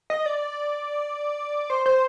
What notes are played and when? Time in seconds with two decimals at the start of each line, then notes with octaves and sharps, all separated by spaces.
0.10 D#5
0.26 D5
1.70 C5
1.86 C5